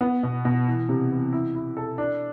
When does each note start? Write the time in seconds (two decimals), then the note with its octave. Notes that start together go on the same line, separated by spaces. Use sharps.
0.01 B3
0.23 B2
0.45 B2
0.68 E3
0.89 C3
1.11 E3
1.33 E4
1.55 E4
1.77 A4
1.98 D4